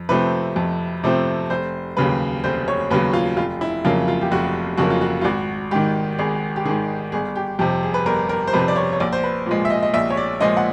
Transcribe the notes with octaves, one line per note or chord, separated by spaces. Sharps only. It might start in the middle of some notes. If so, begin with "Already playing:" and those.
Already playing: F2
C3 F3 A3 C4 B4
F2
C3 F3 A3 C4
F1 C5
D#2 C#3 F#3 B4
F1 C5
C#5
D#2 C#3 F#3 B4
F4
F1 F4
E4
F2 C#3 F#3 A#3 F4
F4
G4
F1 F#4
F2 C#3 F#3 A#3 F#4
F4
F#4
F4
G#1 F#4
G#2 D#3 G4
G#1 G#4
G4
G#2 D#3 G#4
G1 G#4
G4
F2 C3 G4
G#4
B4
G1 A#4
A#4
C5
F2 C3 B4
D5
C#5
C#5
A#1 D5
C5
B4
A#2 F3 G#3
E5
D#5
D#5
A#1 E5
C#5
D5
A#2 F3 G#3 D#5
F#5